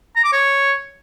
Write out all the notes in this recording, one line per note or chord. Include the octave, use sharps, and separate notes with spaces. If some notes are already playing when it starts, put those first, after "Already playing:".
A#5
D6
C#5